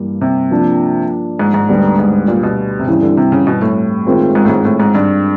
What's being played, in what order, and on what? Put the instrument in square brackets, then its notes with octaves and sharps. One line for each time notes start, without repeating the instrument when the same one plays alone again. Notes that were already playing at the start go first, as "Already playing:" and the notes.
Already playing: [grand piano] G2 E3 G3 A#3
[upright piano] C3
[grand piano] F3 A#3 D4
[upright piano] G#2
G#2
[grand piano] D2 D3 G3 B3
[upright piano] G#2
A#2
B2
C3
[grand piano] G2 E3 G3 C4 E4 [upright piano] C#3
[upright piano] D3
C3
C#3
B2
A2
[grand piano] D#3 G#3 C4 F4 A#4
[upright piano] G#2
A2
G#2
A2
G#2
G2